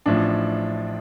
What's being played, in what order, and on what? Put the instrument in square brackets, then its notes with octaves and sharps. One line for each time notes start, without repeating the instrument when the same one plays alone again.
[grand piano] A1 A2 F3 D4